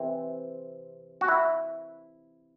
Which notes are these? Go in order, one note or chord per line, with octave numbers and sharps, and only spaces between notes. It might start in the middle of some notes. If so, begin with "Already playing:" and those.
Already playing: C3 E3 C4
F#4
E4